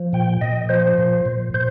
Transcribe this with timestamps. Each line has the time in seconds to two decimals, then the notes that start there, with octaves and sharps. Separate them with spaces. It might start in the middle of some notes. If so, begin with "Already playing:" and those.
Already playing: F3
0.13 A#2 G5
0.41 A#2 D#5
0.69 F3 C5
0.98 A#2
1.26 A#2
1.54 A#2 C5